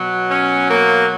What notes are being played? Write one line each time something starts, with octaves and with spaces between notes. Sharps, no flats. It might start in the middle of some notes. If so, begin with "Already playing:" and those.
Already playing: B2 F#3
C#4
A#3